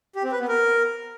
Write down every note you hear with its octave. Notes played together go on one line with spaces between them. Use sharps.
G4
C4
B4
B3
A#4